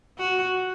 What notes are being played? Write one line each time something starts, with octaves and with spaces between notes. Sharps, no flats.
F#4